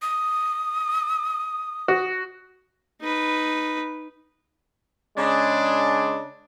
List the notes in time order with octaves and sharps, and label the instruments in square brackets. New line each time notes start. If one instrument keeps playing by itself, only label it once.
[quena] D#6
[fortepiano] F#4
[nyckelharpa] D#4 B4
[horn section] C#3 G#3 D4